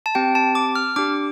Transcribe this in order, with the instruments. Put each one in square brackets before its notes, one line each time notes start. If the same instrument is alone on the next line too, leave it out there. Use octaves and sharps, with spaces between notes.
[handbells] A5
C4 G4 G5
A5
D6
F6
D4 G4 D6